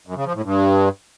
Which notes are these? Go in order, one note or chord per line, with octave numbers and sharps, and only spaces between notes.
F#2
C#3
F3
A2
G2